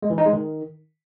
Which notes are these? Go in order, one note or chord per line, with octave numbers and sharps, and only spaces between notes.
G#3
E3
D#4
G#3
D#3